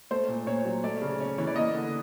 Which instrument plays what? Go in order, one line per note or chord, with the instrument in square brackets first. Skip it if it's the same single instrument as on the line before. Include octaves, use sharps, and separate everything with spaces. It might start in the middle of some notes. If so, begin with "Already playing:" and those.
[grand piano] A3 C5
A#2
A#2 C#5
F#3
A3 D5
C#3
C#4
E3 C#5
D5
A#3 D#5
D3